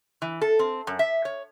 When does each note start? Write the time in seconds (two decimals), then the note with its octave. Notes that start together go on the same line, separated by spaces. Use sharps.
0.22 E3
0.41 A4
0.59 C4
0.87 F#2
0.99 E5
1.25 C#5